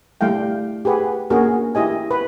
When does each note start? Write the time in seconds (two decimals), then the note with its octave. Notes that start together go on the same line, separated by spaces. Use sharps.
0.21 G3 A3 E4 F5 G5
0.85 G4 G#4 B4 F#5
1.30 A#3 C#4 D4 F#4 G#4 A#4
1.75 E4 G4 D#5 G#5
2.11 B4